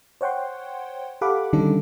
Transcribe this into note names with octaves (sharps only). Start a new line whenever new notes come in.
C5 C#5 F#5 G5 C6
G4 A4 F5 F#5 B5 D6
D3 D#3 G3 C#4 D#4 A4